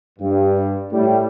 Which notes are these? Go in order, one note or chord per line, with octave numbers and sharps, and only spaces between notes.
G2
A2 G3